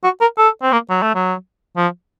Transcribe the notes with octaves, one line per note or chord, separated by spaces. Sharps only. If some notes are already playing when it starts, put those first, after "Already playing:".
F#4
A#4
A4
C4
A#3
F#3
A3
F#3
F3